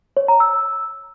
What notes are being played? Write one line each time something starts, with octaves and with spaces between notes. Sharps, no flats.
C#5
A#5
E6